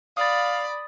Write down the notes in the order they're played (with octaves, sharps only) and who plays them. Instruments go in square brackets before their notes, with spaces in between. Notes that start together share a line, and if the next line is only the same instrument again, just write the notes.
[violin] D5 B5 [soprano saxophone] F5 [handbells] D#6 A6